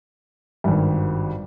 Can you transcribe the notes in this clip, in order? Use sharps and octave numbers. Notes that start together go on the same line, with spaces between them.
G#1 G2